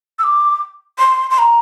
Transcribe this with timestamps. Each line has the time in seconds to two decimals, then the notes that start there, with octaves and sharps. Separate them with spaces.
0.19 E6
0.24 D6
0.99 C6
1.30 C6
1.38 A#5